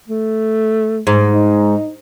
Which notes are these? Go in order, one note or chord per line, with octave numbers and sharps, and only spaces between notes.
A3
G#2
D#4